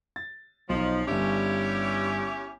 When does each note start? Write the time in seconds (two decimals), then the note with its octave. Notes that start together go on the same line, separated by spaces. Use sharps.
0.16 A6
0.69 B1 F3 D#4
1.07 G1 G2 C#4 E4 G4